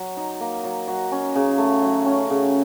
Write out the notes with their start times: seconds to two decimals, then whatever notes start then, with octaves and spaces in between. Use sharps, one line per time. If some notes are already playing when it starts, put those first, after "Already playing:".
Already playing: F#3
0.17 D#4
0.41 A#3
0.64 F#3
0.88 F#3
1.12 C#4
1.35 C#3
1.58 A3
1.82 F#3
2.06 C#4
2.30 C#3